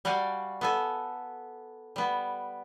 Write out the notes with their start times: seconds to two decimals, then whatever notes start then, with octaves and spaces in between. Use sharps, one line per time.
0.05 G3 F#4 D5 F5 G#5
0.61 B3 A4 G#5
1.96 G3 B3